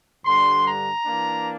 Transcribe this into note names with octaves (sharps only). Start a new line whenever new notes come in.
G2 D3 G3 C6
A#5
E3 A#3 D4